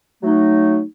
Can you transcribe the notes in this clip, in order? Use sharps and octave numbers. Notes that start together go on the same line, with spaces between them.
F#3 A3 D#4